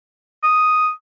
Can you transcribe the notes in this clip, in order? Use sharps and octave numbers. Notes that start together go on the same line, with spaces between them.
D#6